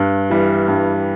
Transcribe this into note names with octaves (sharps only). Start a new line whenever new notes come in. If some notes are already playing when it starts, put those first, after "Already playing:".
Already playing: G2
E3 G3
G2